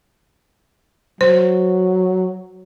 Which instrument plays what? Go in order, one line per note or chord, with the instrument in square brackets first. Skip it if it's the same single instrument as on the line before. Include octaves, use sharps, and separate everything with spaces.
[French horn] F#3 [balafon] C5